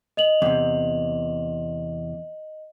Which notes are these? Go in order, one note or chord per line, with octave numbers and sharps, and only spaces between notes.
D#5 F7 F#7
E2 C3